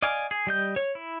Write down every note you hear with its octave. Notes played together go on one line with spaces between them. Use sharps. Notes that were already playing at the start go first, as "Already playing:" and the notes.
D5 D#5 F5 G#5 D6
G#4
G3 D#5 G6
C#5
E4